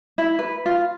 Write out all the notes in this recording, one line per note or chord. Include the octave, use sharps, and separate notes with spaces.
E4
B4
F4